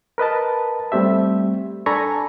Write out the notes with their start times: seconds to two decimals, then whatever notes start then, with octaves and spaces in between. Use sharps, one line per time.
0.18 A#4 B4 D#5 A5
0.92 G3 A3 C4 G4 E5
1.86 D4 A4 G#5 A#5 B5 C#6